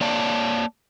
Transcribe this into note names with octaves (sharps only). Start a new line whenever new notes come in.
A#3 C#5 D5 F5 A5